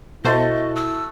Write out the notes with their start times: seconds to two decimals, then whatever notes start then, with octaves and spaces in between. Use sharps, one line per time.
0.25 B2 A3 E4 F#4 C5 D#5 A5
0.75 E6